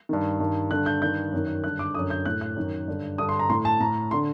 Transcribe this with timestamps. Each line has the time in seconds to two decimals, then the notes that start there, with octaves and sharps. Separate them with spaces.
0.09 G2 D#3
0.40 G2 D#3
0.71 G2 D3 F#6
0.86 G6
1.02 G2 D#3 G6
1.32 F#2 D#3
1.64 G2 D3 F#6
1.79 D6
1.95 F#2 D3 D#6
2.10 G6
2.25 A2 F#6
2.41 F#6
2.56 F#2 D#3
2.88 G2 D3
3.18 G2 D3 D#6
3.29 C6
3.39 A#5
3.50 A2 C6
3.65 A5
3.80 A2 A#5
4.11 D3 C6